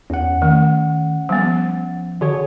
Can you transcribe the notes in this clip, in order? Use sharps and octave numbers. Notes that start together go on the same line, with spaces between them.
E2 C#4 F#5
D#3 A3
F3 G3 B3
D3 F#4 G#4 C#5